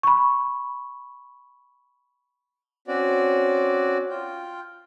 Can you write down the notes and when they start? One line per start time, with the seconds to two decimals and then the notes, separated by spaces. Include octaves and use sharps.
0.03 B5 C#6
2.88 C4 C#4 F#4 D5
4.10 F4 G5